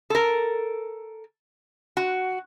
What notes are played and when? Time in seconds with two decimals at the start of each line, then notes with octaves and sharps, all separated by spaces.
0.10 A4 A#4
1.97 F#4